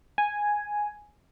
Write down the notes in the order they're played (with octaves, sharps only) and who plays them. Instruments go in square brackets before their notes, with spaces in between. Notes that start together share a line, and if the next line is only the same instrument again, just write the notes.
[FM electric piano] G#5